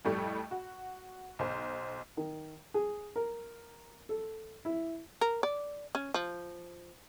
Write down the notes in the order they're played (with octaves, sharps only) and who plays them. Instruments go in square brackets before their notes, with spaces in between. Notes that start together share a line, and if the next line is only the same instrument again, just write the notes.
[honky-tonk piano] F2 A2 G3 A3
F#4
B1 C5
[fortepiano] D#3
G#4
A#4
A4
E4
[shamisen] A#4
D5
C#4
F3